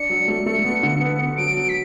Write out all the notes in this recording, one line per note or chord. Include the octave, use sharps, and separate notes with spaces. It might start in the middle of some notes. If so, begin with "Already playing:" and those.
Already playing: D4 C#7
F#3
A3
A3
B3
D3
B3
B3
F#3 D7
F#3
B6